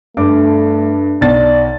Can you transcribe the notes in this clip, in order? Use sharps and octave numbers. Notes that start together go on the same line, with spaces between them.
G2 A3 D6
B1 D5 A6